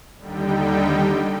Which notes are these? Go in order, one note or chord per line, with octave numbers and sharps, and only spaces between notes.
D#2 D3 G3 D#4 G5